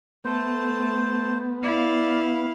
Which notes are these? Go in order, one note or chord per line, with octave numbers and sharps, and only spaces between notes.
A3 B3 C5 A5
E4 D5 F5